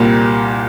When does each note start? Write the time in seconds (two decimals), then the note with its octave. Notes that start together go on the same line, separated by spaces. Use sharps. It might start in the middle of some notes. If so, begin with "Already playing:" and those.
Already playing: C2 A#2 G3 A#3